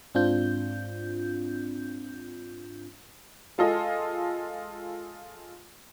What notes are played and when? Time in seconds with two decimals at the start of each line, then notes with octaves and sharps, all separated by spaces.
0.14 G#2 C4 D4 F4 G6
3.58 G#3 F4 A4 D#5 G#5